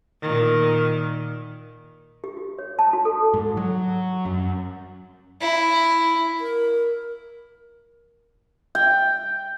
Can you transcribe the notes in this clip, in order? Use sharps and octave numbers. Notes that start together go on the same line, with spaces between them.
A#2 D#3
G4
F#4
C#5
A5
F#4
A4
G#2
F#3
F#2
E4
A#4
G5